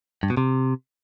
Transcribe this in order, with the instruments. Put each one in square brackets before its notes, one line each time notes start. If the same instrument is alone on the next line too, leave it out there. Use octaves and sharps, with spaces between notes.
[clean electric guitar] G2
B2
C3